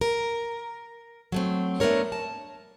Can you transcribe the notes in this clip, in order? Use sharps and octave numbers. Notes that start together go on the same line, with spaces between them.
A#4
F#3 A3 C4
A3 B3 D4 A#4 C#5
A5